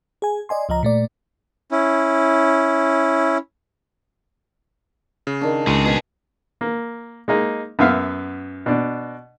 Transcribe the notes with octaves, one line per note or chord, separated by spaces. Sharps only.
G#4 G#5
D5 D#5 G#5 C6
C#2 F3 D#5 A#5
A#2 A3 D5
C#4 E4
C#3
D#3 D4
C#2 A3 G#4
B2 G#4 B4
A#3
G#3 A#3 D#4
F#2 B3 E5 F5 F6
B2 D4